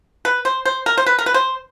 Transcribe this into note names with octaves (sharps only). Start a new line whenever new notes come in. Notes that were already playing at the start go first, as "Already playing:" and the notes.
B4
C5
C5
A#4
C5
B4
A#4
B4
C5